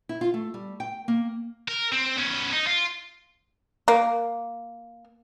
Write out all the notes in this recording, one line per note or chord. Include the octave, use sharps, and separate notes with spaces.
E4
F4
A3
G3
G5
A#3
A#4
C4
B3 C#4
D#4
F4
A#3